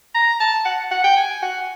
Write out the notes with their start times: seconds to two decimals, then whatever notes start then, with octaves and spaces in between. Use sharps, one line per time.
0.14 A#5
0.40 A5
0.65 F#5
0.91 F#5
1.04 G5
1.17 G#5
1.42 F#5